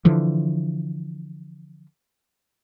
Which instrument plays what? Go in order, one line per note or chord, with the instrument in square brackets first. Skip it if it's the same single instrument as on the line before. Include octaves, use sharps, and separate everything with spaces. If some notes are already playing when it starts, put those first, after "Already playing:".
[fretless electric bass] D3 E3 F3